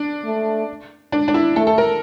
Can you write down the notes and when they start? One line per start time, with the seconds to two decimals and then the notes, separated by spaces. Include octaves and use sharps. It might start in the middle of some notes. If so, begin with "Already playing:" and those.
Already playing: D4
0.25 A3
1.12 D4
1.28 D4
1.34 E4
1.56 A3 A4
1.67 A4
1.78 A#4